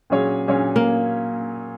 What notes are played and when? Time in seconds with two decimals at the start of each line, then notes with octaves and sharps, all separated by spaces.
0.10 A#2 F#3 C#4 G#4 C#5
0.48 A#2 F#3 C#4 G#4 C#5
0.76 A#3